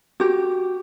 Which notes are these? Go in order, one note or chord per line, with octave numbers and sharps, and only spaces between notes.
F#4 G4